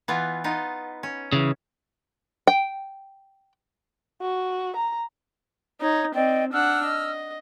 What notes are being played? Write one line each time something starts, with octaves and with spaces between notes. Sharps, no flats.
E3 B3 F4
B3 D#4 F4
C#4
C#3 E3
G5
F#4
A#5
D#4 C#5
C4 D5 D#5 G5
D4 F#5 E6 F6
D#5